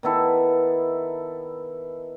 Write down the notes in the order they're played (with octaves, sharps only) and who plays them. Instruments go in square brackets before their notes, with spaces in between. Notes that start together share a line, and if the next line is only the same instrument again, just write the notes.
[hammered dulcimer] D#3 B3 E4 A4